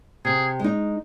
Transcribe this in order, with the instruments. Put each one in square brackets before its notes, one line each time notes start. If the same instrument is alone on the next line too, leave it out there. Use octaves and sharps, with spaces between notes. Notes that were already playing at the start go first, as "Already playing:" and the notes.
[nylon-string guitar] C3 [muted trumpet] G#4
[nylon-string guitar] G#3 D#4